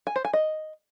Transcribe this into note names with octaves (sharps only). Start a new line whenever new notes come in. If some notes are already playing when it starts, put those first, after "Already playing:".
G#5
C5
G#5
D#5